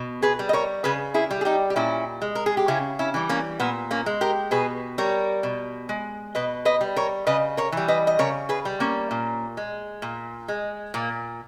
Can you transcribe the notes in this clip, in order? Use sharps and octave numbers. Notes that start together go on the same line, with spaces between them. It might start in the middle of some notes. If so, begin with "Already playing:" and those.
Already playing: B2
G#4 B4
G3
D#5
A#4 C#5
C#3 G#4 B4
E4 G#4
G3
G#4
D#4 G4
G4
A#2 C#4 E4
G#3
A#4
G#4
G4
C#3 C#4 E4
C#4 E4
E3 G3
A#3 C#4
A#2 B3
A#3 C#4
G#3
G4 A#4
B2 G#4 B4
G3 A#4 C#5
B2
G#3
B2 B4 D#5
B4 D#5
G3
A#4 C#5
C#3 B4 D#5
A#4 C#5
E3 G3
B4 D#5
D#5
C#3 A#4 C#5
G#4 B4
G3
A#3 C#4
A#2
G#3
A#2
G#3
A#2 A#3